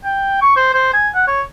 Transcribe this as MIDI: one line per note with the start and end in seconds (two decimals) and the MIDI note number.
0.04 0.38 79
0.41 0.54 85
0.56 0.73 72
0.74 0.92 72
0.94 1.09 80
1.14 1.27 78
1.27 1.41 73